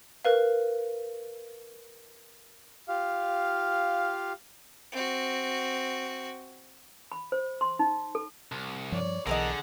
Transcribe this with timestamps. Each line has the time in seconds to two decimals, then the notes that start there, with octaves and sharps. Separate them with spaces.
0.25 A#4 B4 F5
2.88 F4 G4 F5
4.92 C4 F#4
7.12 B5
7.32 C5
7.61 C6
7.79 D#4
8.15 A4
8.52 C2
8.92 G2 F3 G3 C#5 D5
9.27 B1 D3 E3 G#4 A#4 B4 D#5 F#5